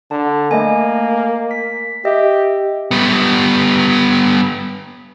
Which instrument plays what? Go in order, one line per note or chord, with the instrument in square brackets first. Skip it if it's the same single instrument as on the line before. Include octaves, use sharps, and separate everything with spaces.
[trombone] D3 [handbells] A5
[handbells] A3 D#5 G#5 [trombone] A#3
[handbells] B6
[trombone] G4 [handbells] D#5 E5
[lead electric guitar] G3 B3